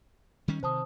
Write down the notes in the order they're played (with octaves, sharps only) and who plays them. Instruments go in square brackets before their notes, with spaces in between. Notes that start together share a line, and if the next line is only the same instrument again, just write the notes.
[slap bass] D#3 G3 C#4
[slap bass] C3 D#3 [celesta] C5 A5 D#6